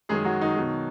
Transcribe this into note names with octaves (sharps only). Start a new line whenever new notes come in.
F#2 D#3 F#3 G#3 G#4
F#3 F#4
D#3 D#4
B2 F#3